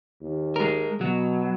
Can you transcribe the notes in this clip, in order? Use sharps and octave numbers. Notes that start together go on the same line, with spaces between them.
D#2
G#3 A#4
B2 F#3